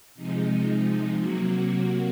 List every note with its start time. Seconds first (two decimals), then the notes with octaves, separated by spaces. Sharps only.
0.15 C3 F3 G#3 D#4
1.18 C3 F#3 A#3 F#4